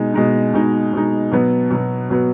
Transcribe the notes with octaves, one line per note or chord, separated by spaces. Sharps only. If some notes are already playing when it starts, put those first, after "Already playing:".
Already playing: B2 G#3 D#4
B2 G#3 D#4
B2 G#3 D#4
B2 G#3 D#4
B2 F#3 B3
B2 F#3 B3
B2 F#3 B3